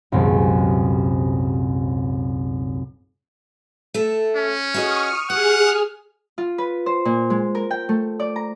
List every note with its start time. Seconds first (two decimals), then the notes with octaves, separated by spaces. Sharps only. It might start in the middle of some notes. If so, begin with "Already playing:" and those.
0.12 D#1 C2 F#2 G#3 B3
3.94 A3 A4
4.36 C#4
4.74 F#4 G#4 D#5 C#6 D#6 F6
5.30 G4 G#4 F#5 F6
6.38 F4
6.58 B4
6.86 C5
7.05 A#2
7.30 G#3
7.55 A#4
7.71 G5
7.89 A3
8.20 D5
8.36 A#5